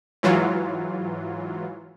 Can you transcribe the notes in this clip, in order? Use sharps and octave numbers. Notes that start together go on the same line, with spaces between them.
G#2 E3 F#3 F4